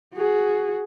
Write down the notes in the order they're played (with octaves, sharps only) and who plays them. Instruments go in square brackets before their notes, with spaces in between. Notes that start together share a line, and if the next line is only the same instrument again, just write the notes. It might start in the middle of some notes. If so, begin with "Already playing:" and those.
[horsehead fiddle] F#4 G#4